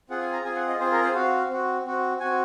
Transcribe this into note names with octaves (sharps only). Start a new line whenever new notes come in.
C4 F4 G#4 F#5
G#5
A#5
C4 F4 G#4 G#5
F#5
D#5
C4 F4 G#4 C5
A#4
C5
C4 F#4 F5
C4 F#4
C4 F#4
C4 F#4 G#5